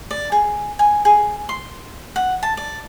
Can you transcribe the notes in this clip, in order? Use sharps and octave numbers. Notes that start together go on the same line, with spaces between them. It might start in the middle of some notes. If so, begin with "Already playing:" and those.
D5
G#4
G#5
G#4
C6
F#5
A5
D5